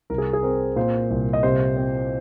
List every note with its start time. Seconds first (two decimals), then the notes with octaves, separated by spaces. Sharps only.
0.10 C2 A#4
0.18 G#4
0.33 G#4
0.43 C4 A#4
0.76 A#2 C5
1.10 C2
1.33 D#5
1.43 C3 C5
1.77 C4